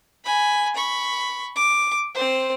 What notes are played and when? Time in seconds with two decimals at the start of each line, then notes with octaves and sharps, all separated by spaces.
0.24 G#5 B5
0.75 B5 C#6
1.56 D6
2.15 C4 C5